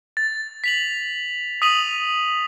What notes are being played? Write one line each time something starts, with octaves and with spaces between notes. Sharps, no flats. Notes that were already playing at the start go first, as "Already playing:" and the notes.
A6
B6 F7 F#7
D#6 B6 D#7 F7 F#7